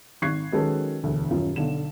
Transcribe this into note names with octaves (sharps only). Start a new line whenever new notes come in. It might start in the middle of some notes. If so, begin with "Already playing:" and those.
G#1 C#6 F#6 G#6 C7
D#3 F#3 G#3 C#4 A4 B4
E1 D2
D#1 F#2 F4
B1 D3 E7